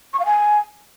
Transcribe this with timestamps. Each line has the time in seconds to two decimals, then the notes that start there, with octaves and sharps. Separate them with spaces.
0.13 C#6
0.20 F5
0.26 G#5